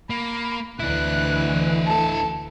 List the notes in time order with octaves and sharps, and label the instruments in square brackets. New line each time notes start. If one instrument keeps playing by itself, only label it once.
[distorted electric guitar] A#3 [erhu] B5
[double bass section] D2 E3 [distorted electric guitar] D4 E4 [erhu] F#6
[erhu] A4